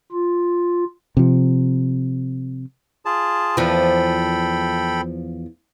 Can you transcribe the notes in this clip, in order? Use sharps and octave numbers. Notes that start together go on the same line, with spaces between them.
F4
C3 F3
F4 G#4 A5
E2 F3 A4 G5 B5